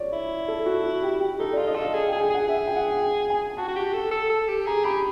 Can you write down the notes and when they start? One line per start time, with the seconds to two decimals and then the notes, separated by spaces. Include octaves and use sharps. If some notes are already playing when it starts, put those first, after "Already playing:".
Already playing: C#5 D5
0.12 E4
0.48 A4
0.66 F#4
0.85 F#4
1.03 G4
1.20 G4
1.39 D#4 A4
1.53 F4 D5
1.67 D#5
1.76 A4
1.81 F5
1.93 G#4
2.08 G5
2.12 G#4 G#5
2.21 G5
2.30 G#4 F#5
2.48 G#4 E5
2.67 G5
2.76 F#5
3.03 G5
3.30 G#5
3.57 F#4 A5
3.68 F#4
3.76 G4
3.94 A4
4.11 A4
4.30 A4
4.49 G4
4.66 G#4 A#5
4.84 G4 B5